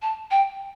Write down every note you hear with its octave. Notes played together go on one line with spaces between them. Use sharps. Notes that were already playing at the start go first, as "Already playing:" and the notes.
A5
G5